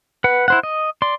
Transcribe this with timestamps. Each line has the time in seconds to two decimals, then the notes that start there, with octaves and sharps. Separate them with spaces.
0.24 B4 F#5
0.48 E4 C5 F#5
0.63 D#5
1.02 D5 C6